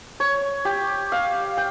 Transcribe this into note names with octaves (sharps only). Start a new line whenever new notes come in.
C#5
G4
F5
G5